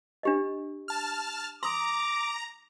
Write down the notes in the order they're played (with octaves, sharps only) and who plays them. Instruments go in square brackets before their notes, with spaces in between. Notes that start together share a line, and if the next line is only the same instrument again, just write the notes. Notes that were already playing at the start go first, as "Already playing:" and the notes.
[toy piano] D4 G4 D#5
[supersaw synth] A5 F6
[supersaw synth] A#5 [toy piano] C6 D#6 [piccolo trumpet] D6